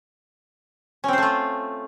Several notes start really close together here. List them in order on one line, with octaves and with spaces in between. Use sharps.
C#4 C4 C5 A3 F4